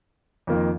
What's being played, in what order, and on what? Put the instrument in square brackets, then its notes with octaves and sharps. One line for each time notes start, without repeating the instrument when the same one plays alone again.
[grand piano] F2 D#3 A#3 F4